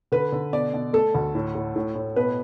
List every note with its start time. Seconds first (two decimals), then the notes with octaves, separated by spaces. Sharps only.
0.12 D3 B4
0.32 D3
0.53 B2 D5
0.74 B2
0.93 A3 A4
1.15 D2
1.35 A2
1.55 A2
1.76 A2
1.95 A2
2.16 B2 B4